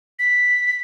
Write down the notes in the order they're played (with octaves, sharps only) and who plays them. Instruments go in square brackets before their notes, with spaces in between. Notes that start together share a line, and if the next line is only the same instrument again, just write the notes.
[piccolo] B6